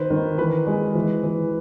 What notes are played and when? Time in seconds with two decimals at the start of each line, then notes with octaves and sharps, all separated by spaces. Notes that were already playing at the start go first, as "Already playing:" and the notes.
Already playing: D#3 B4 C5
0.10 D#3
0.38 E3 B4
0.67 G#3
0.95 E3
1.23 E3